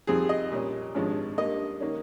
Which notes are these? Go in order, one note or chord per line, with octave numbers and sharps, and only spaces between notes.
F2 D#3 G3 C4 G#4
D#5
A#2 G3 C#4
G#1 G2 F3 G#3 C#4
G2 G3 A#3 D#5
D#3 A#3 C#4